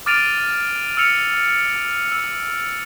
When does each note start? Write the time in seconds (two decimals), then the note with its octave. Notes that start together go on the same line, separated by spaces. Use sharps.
0.06 D6 F6 A6 D7 D#7 F7
0.97 E6 F6 C#7 F7
2.12 E6